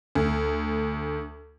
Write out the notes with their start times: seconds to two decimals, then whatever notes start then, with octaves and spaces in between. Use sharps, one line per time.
0.15 D2